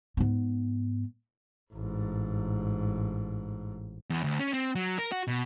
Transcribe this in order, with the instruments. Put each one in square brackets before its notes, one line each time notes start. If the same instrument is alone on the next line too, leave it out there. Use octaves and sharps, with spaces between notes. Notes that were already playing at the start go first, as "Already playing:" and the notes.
[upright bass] G#2 B3
[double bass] A1 G#2
[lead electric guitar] E2
D2
C#4
C4
F#3
A#4
F#4
B2